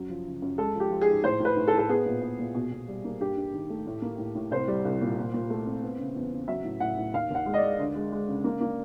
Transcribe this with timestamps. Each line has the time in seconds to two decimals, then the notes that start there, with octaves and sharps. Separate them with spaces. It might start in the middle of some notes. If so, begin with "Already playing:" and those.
Already playing: F#2 F#3
0.10 F3
0.26 C#3
0.42 F#2
0.58 G#3 A4
0.75 F3
0.80 G4
0.90 F3
1.01 G#4
1.08 G#2
1.24 A2 C5
1.40 A2
1.45 B4
1.57 A2
1.68 A4
1.72 A2
1.78 A4
1.89 B3 G#4
2.06 A#2
2.22 B3
2.39 A#2
2.55 B2
2.71 B2
2.88 G3
3.04 A#3
3.20 G2 G4
3.36 G2
3.54 D#3
3.70 A3
3.86 A2
4.02 A#3
4.18 A2
4.35 A2
4.51 C2 C5
4.68 G3
4.85 C2
5.01 A#2
5.18 A#2
5.34 A#2
5.50 A3
5.66 C4
5.83 B3
5.99 C#3
6.16 E2
6.32 C#3
6.48 F#3 E5
6.64 A2
6.80 A2 F#5
6.97 A2
7.13 D#2 F5
7.30 D#2 F#5
7.46 G#3
7.54 D#5
7.57 D5
7.63 G#3
7.79 D2
7.95 G#3
8.12 G#3
8.28 C#3
8.44 A#3
8.60 A#3